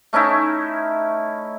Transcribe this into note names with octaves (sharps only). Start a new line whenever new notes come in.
A3 C#4 D#4 E4